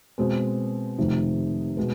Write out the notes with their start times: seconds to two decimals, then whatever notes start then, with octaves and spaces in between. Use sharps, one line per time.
0.18 B2 G#3 C4
0.98 F1 F2 C3 D#3
1.77 B2 G#3 B3